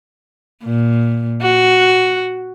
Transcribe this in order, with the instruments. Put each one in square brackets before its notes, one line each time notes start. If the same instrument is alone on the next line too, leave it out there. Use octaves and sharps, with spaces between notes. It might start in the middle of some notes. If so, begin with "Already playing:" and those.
[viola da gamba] A#2
F#4